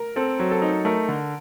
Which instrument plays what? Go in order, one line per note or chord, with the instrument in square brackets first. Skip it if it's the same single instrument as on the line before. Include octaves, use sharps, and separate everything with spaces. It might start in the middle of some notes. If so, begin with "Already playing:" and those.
Already playing: [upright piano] A#4
[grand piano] C4 [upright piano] A4
[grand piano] F#3
[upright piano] A4
[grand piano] D#4
[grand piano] A3 [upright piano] A#4
[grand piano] D3